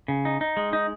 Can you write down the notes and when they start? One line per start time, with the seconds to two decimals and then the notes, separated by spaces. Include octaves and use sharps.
0.08 C#3
0.25 D#4
0.41 D#4
0.57 G#3
0.73 D#4